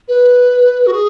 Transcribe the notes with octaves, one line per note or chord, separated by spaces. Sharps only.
B4
F#4
G#4